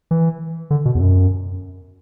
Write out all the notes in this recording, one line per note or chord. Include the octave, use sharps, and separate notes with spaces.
E3
D3
B2
E2
F#2